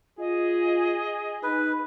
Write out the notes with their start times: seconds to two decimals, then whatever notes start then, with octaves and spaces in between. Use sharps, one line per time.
0.19 F4 G#4 D#5
1.43 D#4 B4